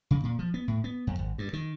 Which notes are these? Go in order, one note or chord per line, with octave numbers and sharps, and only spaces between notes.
C#3
A#2
F3
B3
A2
B3
F2
G#1
G2
D#3